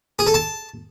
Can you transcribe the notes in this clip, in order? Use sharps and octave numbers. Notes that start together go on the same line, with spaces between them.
G#4
A4
A5